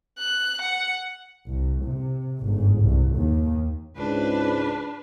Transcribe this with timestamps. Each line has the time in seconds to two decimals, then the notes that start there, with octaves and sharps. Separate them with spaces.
0.18 F#6
0.61 F#5
1.47 C2
1.84 C3
2.41 G1 G#2
2.81 C2 G2
3.16 D#2 D#3
3.96 C#2 G#2 D4 B4